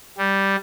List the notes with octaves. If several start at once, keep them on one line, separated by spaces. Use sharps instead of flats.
G3